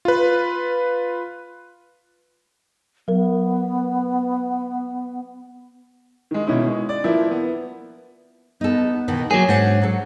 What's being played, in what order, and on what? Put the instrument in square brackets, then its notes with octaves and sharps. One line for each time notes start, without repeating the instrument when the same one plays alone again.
[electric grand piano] F4 B4
[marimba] F#3 A#4 [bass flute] B3
[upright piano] D#3 G#3
B2 D#3 C#4 E4
G#3
D5
E3 F3 A#3 E4
B3
[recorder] B3 [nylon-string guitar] D#4 A4
[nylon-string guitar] B2 D#3 E3
[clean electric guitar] F#3 G#4 [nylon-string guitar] A#3 [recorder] C#5
[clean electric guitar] G#2 [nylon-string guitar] D4 C5 F#5
[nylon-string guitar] F#3 A4